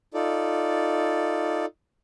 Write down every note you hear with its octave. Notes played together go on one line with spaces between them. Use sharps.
D#4 F4 A4 D5